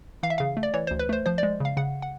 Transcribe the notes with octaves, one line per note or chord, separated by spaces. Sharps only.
E3 F5
E5
C#3 F5
A3
D5
E3 C#5
D2 C5
B4
A3 C5
F3 C5
G#3 D5
C#3 F5
C#3 F#5
F#5